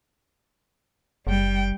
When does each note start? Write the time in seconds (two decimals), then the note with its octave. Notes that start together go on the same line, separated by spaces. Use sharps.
1.27 F#1 G3 G5